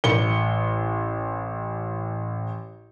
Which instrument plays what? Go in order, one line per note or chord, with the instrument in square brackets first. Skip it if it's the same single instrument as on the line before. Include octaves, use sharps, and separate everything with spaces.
[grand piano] A1 C#7 G7